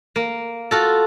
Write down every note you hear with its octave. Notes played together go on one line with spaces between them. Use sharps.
A#3
F4 F#4 A4